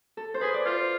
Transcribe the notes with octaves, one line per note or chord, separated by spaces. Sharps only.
A4
C5
G#4 B4
D5
F4 C5